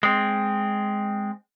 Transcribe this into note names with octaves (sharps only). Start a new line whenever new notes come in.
G#3 C4